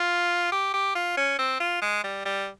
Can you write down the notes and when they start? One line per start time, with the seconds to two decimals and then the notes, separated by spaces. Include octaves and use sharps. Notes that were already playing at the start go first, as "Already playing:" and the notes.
Already playing: F4
0.52 G4
0.74 G4
0.95 F4
1.17 C#4
1.39 C4
1.60 F4
1.82 G#3
2.04 G3
2.25 G3